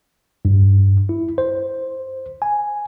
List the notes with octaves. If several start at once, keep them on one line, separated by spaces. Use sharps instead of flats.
G2
E4
C5
G#5